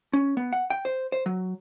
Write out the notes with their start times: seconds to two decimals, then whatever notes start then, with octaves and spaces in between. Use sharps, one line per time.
0.13 C#4
0.37 B3
0.53 F#5
0.70 G5
0.85 C5
1.12 C5
1.26 F#3